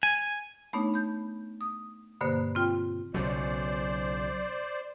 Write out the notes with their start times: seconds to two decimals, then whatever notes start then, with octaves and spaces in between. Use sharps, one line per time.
0.03 G#5
0.73 A3 B3 D4 D#4 C#5
0.94 B5 G6
1.61 D#6
2.21 G2 B2 D3 A#3 C5 F#6
2.55 C4 F4 G5
3.14 B1 C#3 F#3 C5 D5